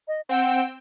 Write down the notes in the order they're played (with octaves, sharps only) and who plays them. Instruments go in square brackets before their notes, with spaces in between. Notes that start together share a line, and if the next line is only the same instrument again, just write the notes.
[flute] D#5
[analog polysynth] C4 G5 E7 [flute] F#5